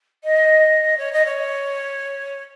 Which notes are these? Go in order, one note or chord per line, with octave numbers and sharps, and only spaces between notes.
D#5
C#5
D#5
C#5